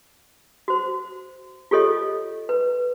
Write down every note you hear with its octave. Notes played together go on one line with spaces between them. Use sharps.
F#4 C5
F4 G4 A4 C#5 D#5
B4